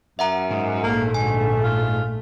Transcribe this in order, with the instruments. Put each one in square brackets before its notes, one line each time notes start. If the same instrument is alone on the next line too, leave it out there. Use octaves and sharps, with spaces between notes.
[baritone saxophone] F#2 [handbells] E5 F#5 A#5
[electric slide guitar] G#2
[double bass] A#1 A3 [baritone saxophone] A#3
[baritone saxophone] D2 [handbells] G#5
[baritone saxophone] F4